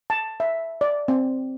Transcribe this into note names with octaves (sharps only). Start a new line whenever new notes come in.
A5
E5
D5
C4